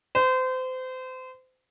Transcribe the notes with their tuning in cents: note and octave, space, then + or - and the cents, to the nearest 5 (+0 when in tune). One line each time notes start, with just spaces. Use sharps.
C5 -30